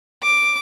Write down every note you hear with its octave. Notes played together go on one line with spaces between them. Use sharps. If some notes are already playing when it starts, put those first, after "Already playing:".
D6